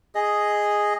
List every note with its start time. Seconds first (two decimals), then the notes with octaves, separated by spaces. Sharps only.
0.15 G#4 D#5